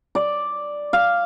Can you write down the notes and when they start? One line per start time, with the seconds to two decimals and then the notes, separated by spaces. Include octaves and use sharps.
0.15 D5
0.93 F5